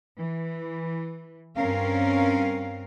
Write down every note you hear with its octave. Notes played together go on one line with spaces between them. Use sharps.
E3
G2 C4 C#4 A#4 F5